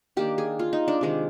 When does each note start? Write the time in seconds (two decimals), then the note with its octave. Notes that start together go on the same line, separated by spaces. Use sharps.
0.17 D#3 A#3 D4 G4
0.38 G#4
0.59 F4
0.73 D#4
0.88 D4
1.01 C3 D#3 G#3 D4